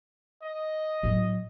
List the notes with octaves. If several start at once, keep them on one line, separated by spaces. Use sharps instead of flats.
D#5
A2 F#3